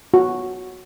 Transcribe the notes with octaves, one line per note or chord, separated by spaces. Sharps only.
F#4